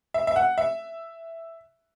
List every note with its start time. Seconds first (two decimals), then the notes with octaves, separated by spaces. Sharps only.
0.14 E5
0.27 E5
0.36 F#5
0.58 E5